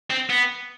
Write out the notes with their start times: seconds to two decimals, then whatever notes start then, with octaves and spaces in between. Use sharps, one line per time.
0.10 C4
0.30 B3